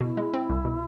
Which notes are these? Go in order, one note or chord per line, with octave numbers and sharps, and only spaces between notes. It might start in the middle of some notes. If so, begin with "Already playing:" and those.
B2 E4
G#3
C4
C2
B2